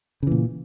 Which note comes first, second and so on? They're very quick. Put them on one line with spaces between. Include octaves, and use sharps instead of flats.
C#3 E3 A#2